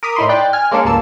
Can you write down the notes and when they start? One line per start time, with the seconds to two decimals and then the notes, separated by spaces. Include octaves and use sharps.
0.03 A#4 D6 D#6 F6 B6
0.16 A2 D#4 E4 B5 C6
0.29 D5 G5 F#6
0.53 G#5 F6
0.71 G#3 A#3 C#4 D4 A4 A#4
0.84 C#2 G2 A#3 A5 E6